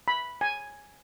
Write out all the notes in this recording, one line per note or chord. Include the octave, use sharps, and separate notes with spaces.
B5
G#5